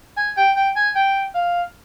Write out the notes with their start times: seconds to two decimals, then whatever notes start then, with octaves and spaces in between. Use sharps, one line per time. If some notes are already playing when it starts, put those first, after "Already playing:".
0.16 G#5
0.37 G5
0.56 G5
0.75 G#5
0.95 G5
1.34 F5